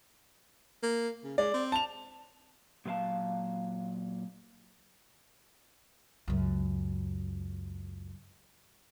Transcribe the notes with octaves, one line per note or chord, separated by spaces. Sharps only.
A#3
C#3
G#3 D5
C4
A5 F7
A#2 F#3 B4 F5 A5
C#2 F#2